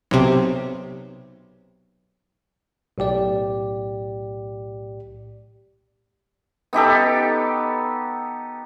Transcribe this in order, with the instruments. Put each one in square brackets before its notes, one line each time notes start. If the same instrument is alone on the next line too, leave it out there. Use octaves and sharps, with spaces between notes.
[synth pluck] B1 C3
[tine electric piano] B1 A2 G4 D5
[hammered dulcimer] B3 D#4 G4 A4